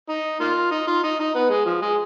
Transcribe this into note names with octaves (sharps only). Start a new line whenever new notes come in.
D#4
A#3 F4
D#4
F4
D#4
D#4
B3
G#3
F3
G#3